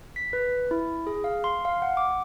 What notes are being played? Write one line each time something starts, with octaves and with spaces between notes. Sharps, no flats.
B6
B4
E4
G#4
F5
C6
F5
F#5
D6